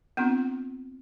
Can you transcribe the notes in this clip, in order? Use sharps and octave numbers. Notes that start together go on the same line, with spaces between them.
B3 C4 D4 F4